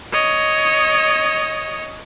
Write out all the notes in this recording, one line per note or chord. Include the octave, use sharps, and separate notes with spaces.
C#5 D#5